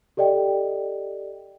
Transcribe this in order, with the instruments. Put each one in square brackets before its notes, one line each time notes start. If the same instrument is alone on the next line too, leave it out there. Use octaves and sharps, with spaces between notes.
[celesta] G4 A4 D5 D#5 G5